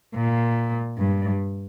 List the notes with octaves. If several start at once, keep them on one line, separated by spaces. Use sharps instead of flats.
A#2
G2